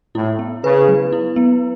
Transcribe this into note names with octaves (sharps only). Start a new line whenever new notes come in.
A2 E4
B3
C#3 B4
F#3
E4
B3